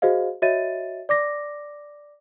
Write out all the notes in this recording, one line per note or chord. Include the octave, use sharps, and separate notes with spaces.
F#4 G#4 C5 D#5 F5
F#4 C#5 D#5 E5 A6 D#7
D5 D6 A#6